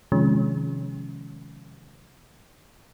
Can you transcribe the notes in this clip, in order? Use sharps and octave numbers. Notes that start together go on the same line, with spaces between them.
C3 D#3 F3 G#3 C#4